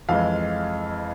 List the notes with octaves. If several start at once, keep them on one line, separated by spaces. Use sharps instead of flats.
F2 E3 G#3 F5